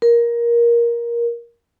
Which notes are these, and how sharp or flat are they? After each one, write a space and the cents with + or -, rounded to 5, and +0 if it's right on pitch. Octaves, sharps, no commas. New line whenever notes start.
A#4 +15